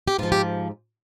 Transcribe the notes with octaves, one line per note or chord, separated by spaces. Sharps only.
G4
G#2 F3 F4
G4